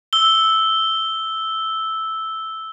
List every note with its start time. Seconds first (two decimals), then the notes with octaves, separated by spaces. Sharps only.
0.13 E6 G7